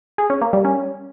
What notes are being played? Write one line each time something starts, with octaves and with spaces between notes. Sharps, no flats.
G#4
C#4
A#3
G3
C#4